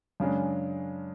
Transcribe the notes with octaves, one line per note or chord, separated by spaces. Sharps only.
F#2 C#3 G#3 D4